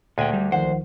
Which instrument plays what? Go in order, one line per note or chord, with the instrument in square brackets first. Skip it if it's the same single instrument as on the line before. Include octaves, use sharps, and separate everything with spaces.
[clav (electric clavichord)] D2 G#3 G#5 [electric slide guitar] A#2 G5
[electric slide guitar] G3
[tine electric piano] C2 D#3 F3 [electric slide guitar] C5 [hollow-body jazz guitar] F#5